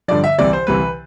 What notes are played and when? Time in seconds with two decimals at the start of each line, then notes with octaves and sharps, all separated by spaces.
0.08 G2 D3 F3 D5
0.24 E5
0.38 C2 C3 E3 D5
0.53 C5
0.67 C2 C3 E3 B4